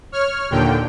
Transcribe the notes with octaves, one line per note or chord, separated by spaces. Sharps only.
C#5 F6
D#2 A#2 D3 G5